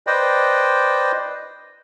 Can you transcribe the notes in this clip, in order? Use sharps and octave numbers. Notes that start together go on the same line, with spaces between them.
B4 C5 D5 D#5 G5